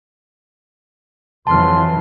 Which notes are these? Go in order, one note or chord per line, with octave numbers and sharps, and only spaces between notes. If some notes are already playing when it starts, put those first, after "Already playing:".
F2 E3 F#3 A5 C6 F6